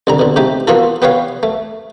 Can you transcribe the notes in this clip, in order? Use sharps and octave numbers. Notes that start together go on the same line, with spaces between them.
C2 D3 A#5
B2 D3
G#2 C3 A3 D#4 G4
A#3 B3 F4 F#4 A4
B3 G4 B4 C#5 F5
A3